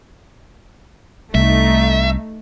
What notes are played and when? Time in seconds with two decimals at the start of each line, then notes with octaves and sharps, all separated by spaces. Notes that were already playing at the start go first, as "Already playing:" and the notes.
1.35 C2 A3 D#4 E5